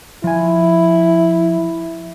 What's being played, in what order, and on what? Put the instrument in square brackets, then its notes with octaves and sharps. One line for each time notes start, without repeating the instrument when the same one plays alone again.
[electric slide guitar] F3 G#5 [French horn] E4